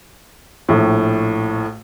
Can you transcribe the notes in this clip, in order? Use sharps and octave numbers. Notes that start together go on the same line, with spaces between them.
A#1 A2